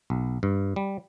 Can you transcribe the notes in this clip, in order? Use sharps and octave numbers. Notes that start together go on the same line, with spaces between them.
B1
G2
G3